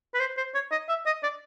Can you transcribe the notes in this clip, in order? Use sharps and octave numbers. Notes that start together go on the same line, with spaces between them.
B4
C5
C5
C#5
D#5
E5
D#5
D5